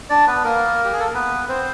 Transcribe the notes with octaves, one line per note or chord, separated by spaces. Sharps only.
D4 D5
B3 B4
A#3 A#4
G4
G#4
A4
A#4
B3 B4
C4 C5